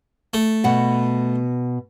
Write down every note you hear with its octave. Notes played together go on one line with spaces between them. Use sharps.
A3
B2 F#5